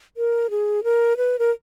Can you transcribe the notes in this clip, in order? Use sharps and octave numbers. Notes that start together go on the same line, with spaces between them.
A#4
G#4
A#4
B4
A#4